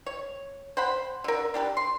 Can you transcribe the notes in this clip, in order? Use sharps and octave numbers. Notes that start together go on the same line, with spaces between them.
C#5
C5 F#5 B5
D3 A#4
D4 G4 A4 B4
C6